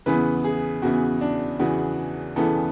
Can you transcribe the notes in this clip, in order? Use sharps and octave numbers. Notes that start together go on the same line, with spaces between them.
E2 C#3 E3 B3 B4
G#4
E2 C#3 E3 B3 F#4
D4
E2 C#3 E3 B3 F#4
E2 C#3 E3 B3 A4